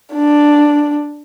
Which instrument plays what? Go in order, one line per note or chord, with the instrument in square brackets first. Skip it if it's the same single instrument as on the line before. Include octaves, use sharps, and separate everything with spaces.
[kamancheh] D4